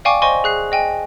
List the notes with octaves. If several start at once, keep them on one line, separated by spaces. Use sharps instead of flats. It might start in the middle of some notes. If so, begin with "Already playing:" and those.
D5 F5 G5 G#5 C#6 D6
C5 D5 D#5 G#5 C6 C#6
G#4 F#6 C7
D#5 G5 G#5